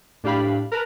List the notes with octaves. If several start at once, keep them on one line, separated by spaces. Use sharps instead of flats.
A2 D4 G4 F5 B5
A#4 B4 A5